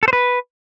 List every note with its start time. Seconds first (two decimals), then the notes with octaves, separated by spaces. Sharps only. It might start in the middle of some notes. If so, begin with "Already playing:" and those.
0.03 A4
0.08 C5
0.13 B4